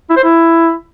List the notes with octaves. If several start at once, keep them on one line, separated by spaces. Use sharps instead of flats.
E4
C5
E4